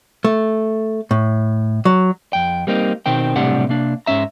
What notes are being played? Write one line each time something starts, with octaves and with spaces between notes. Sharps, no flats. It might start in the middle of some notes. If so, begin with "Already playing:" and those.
A3
A2
F#3
F2 G5
G3 A#3 C4 D#4
B2 D#3 C4 G5
B1 A2 C3 G3 D4 F#5
C3 A#3 D4
G#2 C#3 C#4 E5 A#5